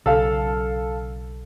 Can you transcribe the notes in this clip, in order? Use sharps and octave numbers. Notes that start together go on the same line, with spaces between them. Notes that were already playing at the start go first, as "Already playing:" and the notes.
B1 C#3 A4 F5